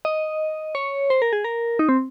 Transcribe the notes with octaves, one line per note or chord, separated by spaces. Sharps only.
D#5
C#5
C5
A#4
G#4
A#4
D#4
C4